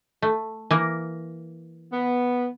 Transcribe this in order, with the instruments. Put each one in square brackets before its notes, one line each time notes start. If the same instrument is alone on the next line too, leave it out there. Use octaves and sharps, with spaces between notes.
[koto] A3
E3 A#3 A#4
[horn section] B3